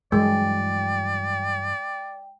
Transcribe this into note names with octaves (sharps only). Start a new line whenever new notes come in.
G2 E3 F#3 G#3 D5 G5